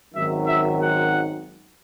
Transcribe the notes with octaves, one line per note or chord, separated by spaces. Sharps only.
G#1 F#2 D#3 F#3 E5
E5
F#5